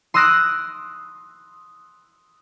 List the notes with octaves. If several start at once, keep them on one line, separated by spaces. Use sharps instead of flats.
C6 D#6 E6 F#6 A#6 D7